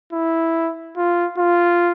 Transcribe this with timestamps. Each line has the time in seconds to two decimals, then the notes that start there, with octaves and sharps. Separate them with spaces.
0.13 E4
0.97 F4
1.38 F4